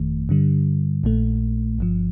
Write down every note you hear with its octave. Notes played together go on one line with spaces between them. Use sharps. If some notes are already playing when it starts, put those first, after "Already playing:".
Already playing: G1 F2 D#3 A3
G2 D3 G3
A#1 A#2 A3
G1 G2 F3